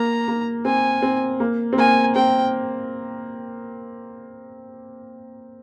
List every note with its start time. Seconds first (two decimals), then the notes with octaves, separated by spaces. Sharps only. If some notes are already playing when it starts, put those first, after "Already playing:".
Already playing: A#3 A#5
0.28 A#3
0.65 C4 G#5
1.02 C4
1.40 A#3
1.73 C4
1.78 A#3 G#5
2.15 C4 G5